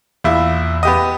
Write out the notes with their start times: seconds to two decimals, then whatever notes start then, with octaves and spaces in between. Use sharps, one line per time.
0.24 A#1 E2 E4
0.83 B3 G4 D#5